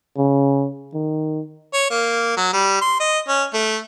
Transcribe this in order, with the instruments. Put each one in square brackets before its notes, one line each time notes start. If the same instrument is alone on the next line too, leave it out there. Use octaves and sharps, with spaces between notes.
[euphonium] C#3
D#3
[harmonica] C#5
A#3
F#3
G3
C6
D#5
C#4
A3